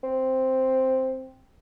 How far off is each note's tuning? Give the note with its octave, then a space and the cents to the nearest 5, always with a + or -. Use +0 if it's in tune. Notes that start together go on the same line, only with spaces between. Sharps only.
C4 +0